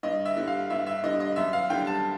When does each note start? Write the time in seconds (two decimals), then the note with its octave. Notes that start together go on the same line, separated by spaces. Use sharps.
0.03 G2 D#5
0.25 E5
0.37 D3 G3
0.47 F5
0.70 G2 E5
0.86 E5
1.04 D3 G3 D#5
1.20 D#5
1.36 F#2 E5
1.53 F5
1.70 D3 G3 G5
1.87 A5